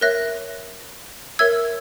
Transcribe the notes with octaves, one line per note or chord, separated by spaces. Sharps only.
A#4 C#5 E5 F#6 A#6
A#4 C#5 E5 E6 G#6